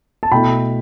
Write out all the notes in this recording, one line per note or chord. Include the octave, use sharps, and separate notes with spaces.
A5
B2 A3 E4 G5 B5